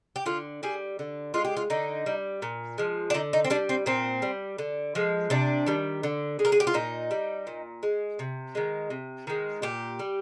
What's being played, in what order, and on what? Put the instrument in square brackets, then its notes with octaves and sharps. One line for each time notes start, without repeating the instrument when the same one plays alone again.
[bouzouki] G4
D3 F4
G3 G#4
D3
G#3 F4
G4
F4
D3 D#4
G3
A#2
F3 G#3
D4
D3 D#4
D#4
C4
G3 D4
C4
A#2 C4
G3
D3
F3 G#3
C3 D4
D#3 G3
D3
G#3
A#4
G#4
G4
F4
A#2 D#4
G3
A#2
G#3
C3
D#3 G#3
C3
D#3 G#3
A#2 G4
G3